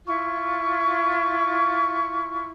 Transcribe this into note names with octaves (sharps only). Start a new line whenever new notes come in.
E4 F4 C#6